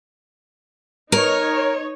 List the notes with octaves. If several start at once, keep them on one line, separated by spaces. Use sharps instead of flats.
D#4 A#4 C#5